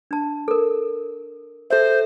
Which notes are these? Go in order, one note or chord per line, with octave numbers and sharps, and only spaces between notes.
D4 A5
A4 A#4
A4 C5 E5